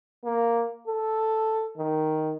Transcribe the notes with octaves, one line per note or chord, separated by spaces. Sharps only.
A#3
A4
D#3